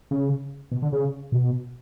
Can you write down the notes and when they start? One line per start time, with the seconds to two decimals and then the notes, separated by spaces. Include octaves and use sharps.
0.11 C#3
0.72 B2
0.82 D3
0.93 C#3
1.32 B2